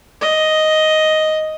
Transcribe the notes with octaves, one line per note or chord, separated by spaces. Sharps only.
D#5